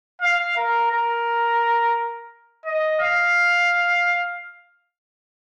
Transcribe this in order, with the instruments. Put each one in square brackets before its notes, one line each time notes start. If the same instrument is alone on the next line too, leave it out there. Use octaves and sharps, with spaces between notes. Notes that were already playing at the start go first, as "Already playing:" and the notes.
[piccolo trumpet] F5
A#4
A#4
D#5
F5